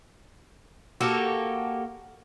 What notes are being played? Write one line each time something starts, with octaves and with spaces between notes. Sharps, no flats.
A#3 F#4 G4 A4